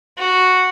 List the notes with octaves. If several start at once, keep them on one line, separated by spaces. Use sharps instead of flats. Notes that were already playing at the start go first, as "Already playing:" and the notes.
F#4